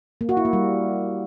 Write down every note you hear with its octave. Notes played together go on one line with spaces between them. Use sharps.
A#3
F#4
E4
A#3
G3